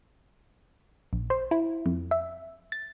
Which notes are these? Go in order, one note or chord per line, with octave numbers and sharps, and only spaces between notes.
A#1
C5
E4
F2
E5
A6